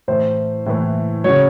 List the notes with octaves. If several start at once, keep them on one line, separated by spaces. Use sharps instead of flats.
A2 E3 C5
A2 E3
C#3 F#3 C#5